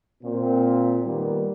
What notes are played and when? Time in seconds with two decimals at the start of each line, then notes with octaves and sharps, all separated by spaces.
0.23 A#2 C4
1.04 D#3 G3 A#3 B3